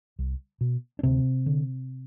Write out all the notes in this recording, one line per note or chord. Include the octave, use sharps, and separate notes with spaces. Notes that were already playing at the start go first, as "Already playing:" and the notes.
C2
B2
D4
D2 C3 C4
D3